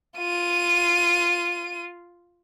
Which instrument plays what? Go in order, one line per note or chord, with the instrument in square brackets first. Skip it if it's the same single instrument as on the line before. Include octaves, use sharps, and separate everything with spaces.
[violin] F4 D#7